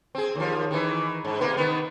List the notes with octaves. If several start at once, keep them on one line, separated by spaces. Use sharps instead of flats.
C4 G#4
D#2 F3
D#3 E3
G#2
C3 A#3 B3
D#3 B3